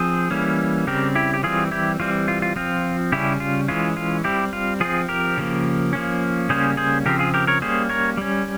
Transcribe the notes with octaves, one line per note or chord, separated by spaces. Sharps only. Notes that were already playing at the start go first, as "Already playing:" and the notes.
Already playing: F3 C4 G#4 C5
E3 G3 A#3 C#4
C#3 G3 C4 G4 A#4
E4 G4
G4
E3 G3 C4 F4 G#4
E4 G4
E3 G3 C4 F4
F4
F4
F3 C4 F4
C#3 G3 C#4 E4 G4
F4
E3 G#3 C#4 F4
F4
G3 C4 E4 G4
F4
F3 C4 F4 G#4
G4 A#4
C#3 F3 A#3
F3 A#3 C#4
C#3 G3 A#3 C#4 G#4 C5
G#4 C5
C#3 F3 C4 G4 A#4
F4 G#4
G4 A#4
A#4 C#5
G3 A#3 C#4 G#4 C5
A#4 C#5
G3 C#4